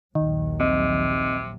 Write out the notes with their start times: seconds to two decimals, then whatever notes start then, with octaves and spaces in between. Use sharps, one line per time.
0.15 A#1 D#2 D#3 F#3
0.60 C3 C4 D#5